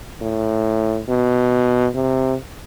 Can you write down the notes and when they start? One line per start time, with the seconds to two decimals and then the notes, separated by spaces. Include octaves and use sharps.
0.21 A2
1.09 B2
1.95 C3